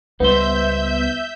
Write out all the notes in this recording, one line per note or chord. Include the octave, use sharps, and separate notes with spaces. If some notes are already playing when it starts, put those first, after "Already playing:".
C#2 G3 G#3 B3 D#4 C5 E5 G6